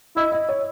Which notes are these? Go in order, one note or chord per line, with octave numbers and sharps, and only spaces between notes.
E4 D#5
D#5
C#5